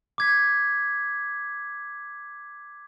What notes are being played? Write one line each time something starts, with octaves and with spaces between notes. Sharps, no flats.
D6 G#6 B6